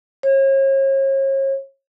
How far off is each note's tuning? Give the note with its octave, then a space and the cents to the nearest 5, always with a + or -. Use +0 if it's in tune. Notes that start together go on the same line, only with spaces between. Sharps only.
C#5 -40